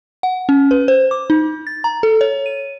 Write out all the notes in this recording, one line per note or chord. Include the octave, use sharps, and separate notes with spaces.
F#5
C#4
B4
C5
D6
D#4
A6
A#5
A4
C#5
D#7